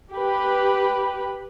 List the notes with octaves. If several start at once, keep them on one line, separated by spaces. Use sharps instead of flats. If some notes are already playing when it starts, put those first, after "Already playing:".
G4 B4